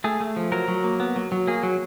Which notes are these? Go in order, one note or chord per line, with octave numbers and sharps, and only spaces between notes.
A3 G#4
A3
F3
F#3 A#4
F#3
A#3
B3
F#3
F#3
A#3 G#4
F#3